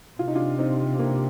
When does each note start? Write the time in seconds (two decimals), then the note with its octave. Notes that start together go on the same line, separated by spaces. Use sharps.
0.19 C3 F4
0.28 D#4
0.35 D4 F4
0.59 C4 D#4
0.99 A#3 D4